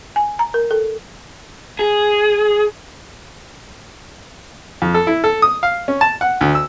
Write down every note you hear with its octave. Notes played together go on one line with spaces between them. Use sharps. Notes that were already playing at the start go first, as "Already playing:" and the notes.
G#5
A#5
A#4
A4
G#4
F2
A4
E4
A4
D#6
F5
C#4
A5
F#5
D2
E6